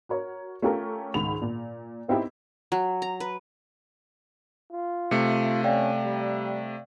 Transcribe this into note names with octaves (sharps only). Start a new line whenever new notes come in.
F#4 A#4 C#5
A3 C#4 F4 G4 A4 A#4
C#2 G#2 D#3 B5 F7
A#2
B3 C4 D#4 E4 G4
F#3
A#5
B4
F4
C3 A3 C#7
C#4 D5 F5 G5
G3